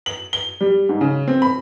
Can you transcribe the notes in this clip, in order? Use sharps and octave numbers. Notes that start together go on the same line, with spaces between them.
F#7
G7
G3
G#2
C#3
C4
B5